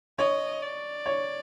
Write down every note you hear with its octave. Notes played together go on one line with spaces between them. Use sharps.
C#5 D#5
D5
C#5